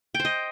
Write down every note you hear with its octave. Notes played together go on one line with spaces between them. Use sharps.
G5
C5
D#5